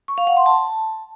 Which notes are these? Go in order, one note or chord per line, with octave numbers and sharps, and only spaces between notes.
C#6
F5
F#5
C6
A5